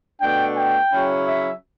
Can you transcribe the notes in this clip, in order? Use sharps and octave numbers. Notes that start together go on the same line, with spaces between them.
B2 A3 D4 G5
G5
C#3 F#3 C#4 E4
E5